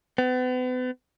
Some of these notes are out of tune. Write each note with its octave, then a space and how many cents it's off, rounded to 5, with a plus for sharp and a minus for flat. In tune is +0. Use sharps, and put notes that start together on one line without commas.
B3 +40